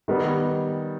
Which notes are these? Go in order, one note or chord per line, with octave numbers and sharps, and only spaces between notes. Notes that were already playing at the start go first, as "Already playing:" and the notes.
D#3 G3 B3